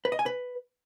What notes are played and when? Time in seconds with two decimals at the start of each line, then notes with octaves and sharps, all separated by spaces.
0.05 B4
0.12 D#5
0.19 G#5
0.26 B4